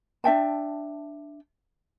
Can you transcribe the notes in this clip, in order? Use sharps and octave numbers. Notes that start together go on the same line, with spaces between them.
D4 E5 G5 A5